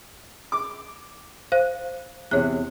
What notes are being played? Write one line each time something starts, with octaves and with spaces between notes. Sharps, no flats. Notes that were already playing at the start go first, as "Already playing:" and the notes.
D6
C5 F5 F#6
E2 C3 C#5 F#6